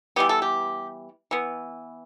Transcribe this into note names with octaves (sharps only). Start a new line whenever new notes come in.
E3 G3 B3 G4
A4
G4
E3 B3